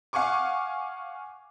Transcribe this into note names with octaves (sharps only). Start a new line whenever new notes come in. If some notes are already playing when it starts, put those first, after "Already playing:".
F5 F#5 G#5 C#6 D6